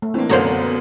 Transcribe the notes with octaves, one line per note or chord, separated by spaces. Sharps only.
A3
E3 A#3 C4 D4
F#2 B2 D3 A#3 C5 C#5 A#5
B3